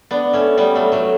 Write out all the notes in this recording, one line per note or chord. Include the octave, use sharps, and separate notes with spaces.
B3 D4
A3 C#4
G3 B3
F#3 A3
F#3 A3